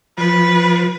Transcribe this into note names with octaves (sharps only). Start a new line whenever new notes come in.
F3 B4